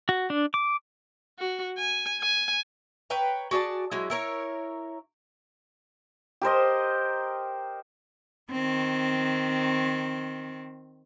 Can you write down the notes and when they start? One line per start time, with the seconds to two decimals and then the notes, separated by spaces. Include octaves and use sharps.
0.09 F#4
0.30 D4
0.54 D6
1.38 F#4
1.78 G#5
2.21 G#5
3.10 B4 C#5 G5 A#5
3.51 F#4 G#4 D5 A5
3.91 F#3 G#3 E4
4.10 E4 A#4 C#5
6.42 G4 A#4 C5 D#5
8.51 D#3 C4